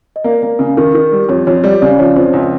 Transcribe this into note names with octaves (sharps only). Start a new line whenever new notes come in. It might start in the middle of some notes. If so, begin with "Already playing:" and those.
D#5
A#3 D5
A#3
C#3
D#3
D#3
G3
F2 C#5
F2 C#5
G3 D5
C#3 D5
F3 C#5
F2 C5
C#2 C#5